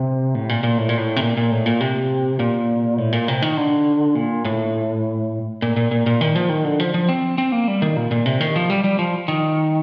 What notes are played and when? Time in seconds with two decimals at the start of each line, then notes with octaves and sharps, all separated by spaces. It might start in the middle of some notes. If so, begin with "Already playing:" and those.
Already playing: C3
0.35 A2
0.49 A#2
0.63 A#2
0.78 A2
0.89 A#2
0.97 A2
1.16 C3
1.22 A#2
1.37 A#2
1.51 A2
1.66 A#2
1.80 C3
2.39 A#2
2.98 A2
3.12 A#2
3.28 C3
3.42 D#3
3.57 D3
4.15 A#2
4.45 A2
5.62 A#2
5.77 A#2
5.91 A#2
6.06 A#2
6.21 D#3
6.35 F3
6.49 D#3
6.65 D3
6.80 F3
6.94 F3
7.09 C4
7.38 C4
7.52 A#3
7.68 G3
7.82 D#3
7.97 A#2
8.11 A#2
8.26 C3
8.40 D#3
8.56 F3
8.70 G3
8.84 G3
8.99 F3
9.28 D#3